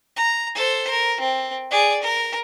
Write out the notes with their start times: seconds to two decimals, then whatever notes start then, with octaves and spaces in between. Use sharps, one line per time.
0.16 A#5
0.55 A4 C5
0.90 A#4
1.20 C4
1.71 G#4 D5
2.02 A#4